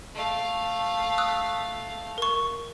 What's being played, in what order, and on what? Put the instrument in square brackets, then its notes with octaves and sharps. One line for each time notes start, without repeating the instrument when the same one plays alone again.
[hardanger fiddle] A3 F5
[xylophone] D#6 E6 F#6
A#4 C#6